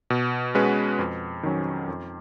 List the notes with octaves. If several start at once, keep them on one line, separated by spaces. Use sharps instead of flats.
B2
G#3 C#4 F#4 B4
F2
D#3 F#3 C#4
F2